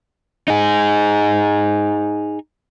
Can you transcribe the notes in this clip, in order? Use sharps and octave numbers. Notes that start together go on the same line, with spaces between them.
D#4 G#4